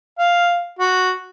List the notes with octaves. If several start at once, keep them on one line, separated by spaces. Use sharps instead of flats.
F5
F#4